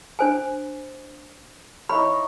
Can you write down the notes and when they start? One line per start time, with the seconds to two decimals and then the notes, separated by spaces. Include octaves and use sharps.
0.19 D4 C5 G#5
1.89 D#4 E4 C#5 B5